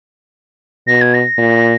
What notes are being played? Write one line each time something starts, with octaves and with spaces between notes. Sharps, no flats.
B2 A#6
G#6
A#6
A#2